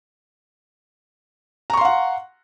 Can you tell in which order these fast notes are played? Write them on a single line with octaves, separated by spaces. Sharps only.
A#5 C#6 C6 F5 F#5